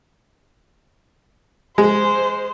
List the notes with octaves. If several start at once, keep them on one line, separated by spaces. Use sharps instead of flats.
G#3 C5